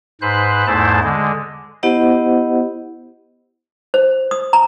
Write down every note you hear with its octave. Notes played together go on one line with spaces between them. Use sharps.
G#2 B4 C5 F#6
E2 G#2 A3 E4 C5 A5
D3 G#3
B3 E4 G4 C5 D#5 F#5
C5
D#6
A#5